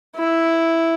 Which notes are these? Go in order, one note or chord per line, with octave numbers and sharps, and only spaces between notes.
E4